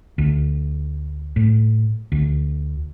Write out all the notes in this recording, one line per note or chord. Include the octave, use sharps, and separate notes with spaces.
D2
A2
D2